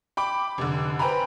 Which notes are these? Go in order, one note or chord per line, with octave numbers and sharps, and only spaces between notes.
G5 B5 D6
F1 D3
B4 C5 G5 G#5 A#5 B5